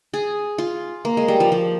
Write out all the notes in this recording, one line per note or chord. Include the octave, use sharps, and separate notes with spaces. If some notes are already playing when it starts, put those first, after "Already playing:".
G#4
F4
A#3
G#3
G3
F3
F3